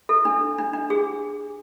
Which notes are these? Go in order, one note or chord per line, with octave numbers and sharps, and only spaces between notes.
A4
D4
D4
D4
G#4